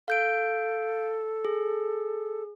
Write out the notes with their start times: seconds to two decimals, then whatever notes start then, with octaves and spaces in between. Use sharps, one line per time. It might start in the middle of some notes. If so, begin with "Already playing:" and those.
0.08 A4 F5 G6 D7
1.45 G#4